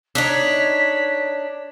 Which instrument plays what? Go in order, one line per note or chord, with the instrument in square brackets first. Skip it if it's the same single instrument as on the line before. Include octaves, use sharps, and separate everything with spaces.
[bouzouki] D4 D#4 C#5 [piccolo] B6